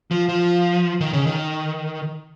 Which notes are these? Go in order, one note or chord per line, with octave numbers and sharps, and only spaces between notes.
F3
F3
D#3
C#3
D#3